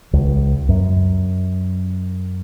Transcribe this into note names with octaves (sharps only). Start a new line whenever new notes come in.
C#2
F#2